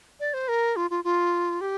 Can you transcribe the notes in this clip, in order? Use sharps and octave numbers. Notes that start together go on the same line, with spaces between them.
D5
C5
A#4
F4
F4
F4
G4